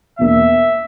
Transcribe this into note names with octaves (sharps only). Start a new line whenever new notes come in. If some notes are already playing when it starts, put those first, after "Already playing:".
E2 B2 A#3 D4 E5